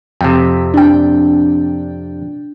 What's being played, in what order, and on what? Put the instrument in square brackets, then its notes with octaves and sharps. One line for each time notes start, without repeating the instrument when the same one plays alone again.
[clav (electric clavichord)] F2 C3 [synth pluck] G5
[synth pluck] D4 G5